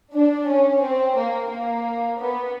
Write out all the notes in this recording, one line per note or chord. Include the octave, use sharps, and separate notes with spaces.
D4
C#4
C4
A#3
A#3
B3